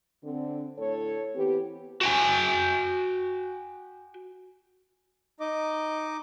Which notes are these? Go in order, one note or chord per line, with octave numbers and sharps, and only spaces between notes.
D3 C4
A2 D3 A4 C#5
E3 B3 C4 G4
F#4 G5 G#5
D#4 D#5 D6